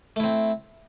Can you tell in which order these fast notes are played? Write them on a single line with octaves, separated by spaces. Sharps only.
A3 E4 C4